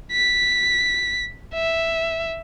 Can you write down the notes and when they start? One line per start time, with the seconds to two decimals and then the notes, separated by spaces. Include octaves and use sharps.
0.12 B6
1.54 E5